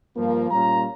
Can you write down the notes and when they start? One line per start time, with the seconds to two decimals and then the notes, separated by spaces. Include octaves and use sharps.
0.16 G2 F3 A#3
0.51 A#2 G3 C#4 F4 A#5